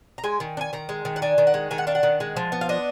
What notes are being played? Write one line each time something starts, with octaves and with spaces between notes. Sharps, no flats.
A#5
G#3 G#5
D#3
D4
G#5
D#3 A#5
G#3
D#3
F#5
D4 G#5
D#3
F#5
G#3
D#3 G#5
F#5
D4 F5
F#5
D#3
G#3
F3
B3
F5
D4 D#5